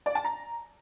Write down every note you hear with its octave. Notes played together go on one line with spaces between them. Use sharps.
D5
A5
A#5